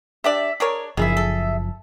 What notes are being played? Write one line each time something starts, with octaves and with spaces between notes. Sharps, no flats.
D4 G4 D5 E5
D4 G#4 A#4 C#5
F#1 D#3 F3 E4 G#4 E5
A4